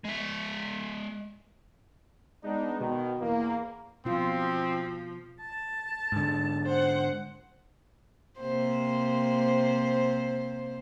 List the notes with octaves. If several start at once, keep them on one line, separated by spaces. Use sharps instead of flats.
G#3 E5
G#3 B3 D4 D#4
B2 D#3
E2 A#3
B2 F3 C4 F4
A5
G#2 D3
C5 F#5
C3 A#3 C5